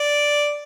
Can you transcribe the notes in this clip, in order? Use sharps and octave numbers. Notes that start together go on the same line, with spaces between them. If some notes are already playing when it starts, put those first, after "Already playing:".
Already playing: D5